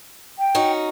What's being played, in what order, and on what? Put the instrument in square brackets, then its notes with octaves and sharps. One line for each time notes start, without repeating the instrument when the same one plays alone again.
[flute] G5
[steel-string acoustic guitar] C#4 D#4 F#4